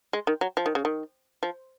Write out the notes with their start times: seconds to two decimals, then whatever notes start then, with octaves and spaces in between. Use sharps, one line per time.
0.13 G#3
0.27 D#3
0.41 F#3
0.57 F3
0.66 D#3
0.75 C#3
0.85 D#3
1.43 F3